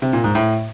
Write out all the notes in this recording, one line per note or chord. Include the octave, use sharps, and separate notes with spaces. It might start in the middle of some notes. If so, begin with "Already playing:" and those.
C3
A#2
G#2
A2